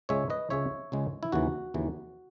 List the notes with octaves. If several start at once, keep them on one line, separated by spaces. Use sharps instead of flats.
C#2 C#3 G#3 C#5 E5
B4 D#5
C#2 C#3 G#3 C#5 E5
C#2 C#3 G#3
E4
D#2 C#3 E3 F#4
D#2 C#3 E3